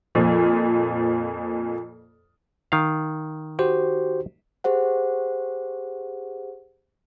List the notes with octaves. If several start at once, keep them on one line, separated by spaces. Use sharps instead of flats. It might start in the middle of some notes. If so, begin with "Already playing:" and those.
F2 A#2 F3
D#3 F5
F#4 G4 C5
G4 G#4 C5 F#5